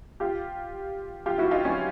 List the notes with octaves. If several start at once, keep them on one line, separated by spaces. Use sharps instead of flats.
F4 G4
F4 G4
E4 F#4
D#4 F4
C#4 D#4